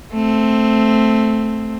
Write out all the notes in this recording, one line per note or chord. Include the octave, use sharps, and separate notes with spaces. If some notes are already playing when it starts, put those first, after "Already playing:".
A3 C4